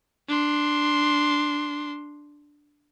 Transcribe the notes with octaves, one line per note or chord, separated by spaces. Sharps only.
D4 C6